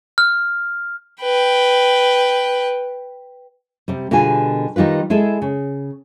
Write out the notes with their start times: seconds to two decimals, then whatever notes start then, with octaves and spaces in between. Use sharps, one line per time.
0.18 F6
1.21 B4 G5
3.88 C3 G3
4.11 B2 D3 G3 F4 G#4 G#5
4.76 D#3 G3 D#4 F4 B4
5.10 G#3 E4 G#4 A4
5.42 C#3